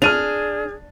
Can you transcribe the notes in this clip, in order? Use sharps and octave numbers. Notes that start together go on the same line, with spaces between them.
D4 G#4 F6 D#7 F7